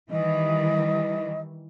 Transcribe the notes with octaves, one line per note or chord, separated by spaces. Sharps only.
D#3 E3 G3 D#5